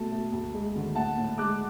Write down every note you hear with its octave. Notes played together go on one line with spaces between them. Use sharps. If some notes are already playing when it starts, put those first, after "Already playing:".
Already playing: B2 A3 A5
A3
D2
G#3
D3
A2 F#5 A5
A2
G#3 D6 F#6